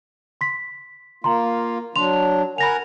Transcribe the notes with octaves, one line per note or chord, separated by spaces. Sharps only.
C6 B6
A#3 F4 A#5 C6
F#3 D4 C6 F7
A#4 F#5 G#5 B5 A#6 F7